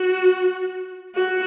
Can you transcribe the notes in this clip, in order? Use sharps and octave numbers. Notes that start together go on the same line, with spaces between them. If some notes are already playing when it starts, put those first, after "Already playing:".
Already playing: F#4
F#4